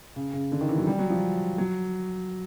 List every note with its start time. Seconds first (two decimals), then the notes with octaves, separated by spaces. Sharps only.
0.16 C#3
0.33 C#3
0.52 D3
0.61 D#3
0.69 E3
0.78 F#3
0.87 G3
0.99 F#3
1.10 F3
1.58 F#3